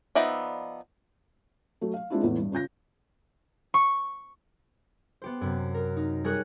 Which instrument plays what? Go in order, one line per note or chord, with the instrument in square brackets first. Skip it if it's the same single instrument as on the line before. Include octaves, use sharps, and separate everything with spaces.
[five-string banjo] F3 B3 D#4 D5 E5
[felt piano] F#3 A3
F5
G#3 C4 D4 E4 F4
E2 A2 B3
G2
C#3 F4 G6 A#6
[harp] C#6
B3 G4 C5
F#2 C3
A#4
D#4
G3 G#4 A#4 C#5 D#6 F#6